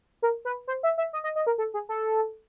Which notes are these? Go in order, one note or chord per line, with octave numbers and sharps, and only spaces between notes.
A#4
B4
C5
E5
E5
D#5
D#5
D#5
A#4
A4
G#4
A4